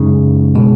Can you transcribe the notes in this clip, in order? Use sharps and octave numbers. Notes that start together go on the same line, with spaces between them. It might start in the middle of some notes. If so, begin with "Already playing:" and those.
Already playing: F#2 C#3 G#3 D#4
B2 G#3